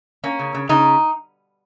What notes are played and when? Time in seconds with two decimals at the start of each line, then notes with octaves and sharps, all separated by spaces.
0.24 A#3 C#4
0.39 C#3
0.55 C#3
0.69 C#3 D#4